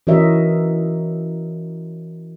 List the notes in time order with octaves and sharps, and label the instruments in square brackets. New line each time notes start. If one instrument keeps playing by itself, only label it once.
[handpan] E3 C#4 F#4 A#4 D#5 E5